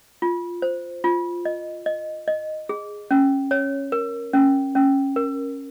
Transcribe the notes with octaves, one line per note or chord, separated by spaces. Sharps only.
F4
C5
F4
D#5
D#5
D#5
G#4
C#4
C#5
A#4
C#4
C#4
A#4